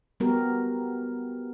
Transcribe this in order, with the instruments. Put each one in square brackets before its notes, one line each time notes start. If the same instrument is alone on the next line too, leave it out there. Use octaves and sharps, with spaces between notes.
[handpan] G3 B3 F#4 G4 A#4